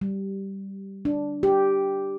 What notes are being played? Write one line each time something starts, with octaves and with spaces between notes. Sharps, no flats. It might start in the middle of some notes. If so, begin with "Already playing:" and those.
G3
D4
G4